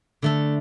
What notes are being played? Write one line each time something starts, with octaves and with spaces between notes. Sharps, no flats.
D3 A3 A4